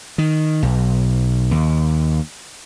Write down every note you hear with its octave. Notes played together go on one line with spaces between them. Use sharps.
D#3
B1
D#2